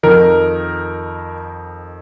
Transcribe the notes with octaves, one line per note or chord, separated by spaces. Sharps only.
F2 D#3 A#4